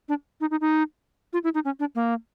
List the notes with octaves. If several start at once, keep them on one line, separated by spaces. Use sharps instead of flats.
D4
D#4
D#4
D#4
F4
E4
D#4
C#4
D4
A#3